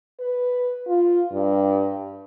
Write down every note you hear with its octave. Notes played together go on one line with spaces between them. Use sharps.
B4
F4
G2